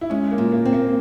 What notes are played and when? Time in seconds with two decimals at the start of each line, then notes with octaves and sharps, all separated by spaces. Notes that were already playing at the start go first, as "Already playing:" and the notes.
0.01 E4
0.10 G#3 C#4
0.31 A#3
0.38 A#2
0.52 A#3
0.65 C4
0.73 A#3